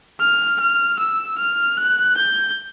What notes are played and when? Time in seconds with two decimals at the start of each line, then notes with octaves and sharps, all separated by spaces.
0.20 F6
0.60 F6
0.99 E6
1.38 F6
1.77 F#6
2.17 G6